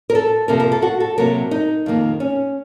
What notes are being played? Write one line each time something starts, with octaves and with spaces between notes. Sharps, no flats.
A#4
A4
F2 C3 F3 A#3 A#4
A#4
A4
F#4
A4
C3 F#3 A#3 A#4
D#4
F2 D#3 A#3
C#4